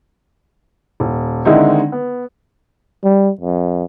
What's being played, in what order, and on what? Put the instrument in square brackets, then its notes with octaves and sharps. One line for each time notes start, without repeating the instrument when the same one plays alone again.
[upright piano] D#1
D3 D#3 G#3 C4 D#4 E4
B3
[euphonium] G3
F2